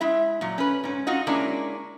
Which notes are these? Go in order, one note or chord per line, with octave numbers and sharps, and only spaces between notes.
G#3 E4 E5
A#2 F#3
C#4 B4
G#2 C#4
D#4 F4 F#4 D#5
G#3 A#3 C#4 D4 E4 A#4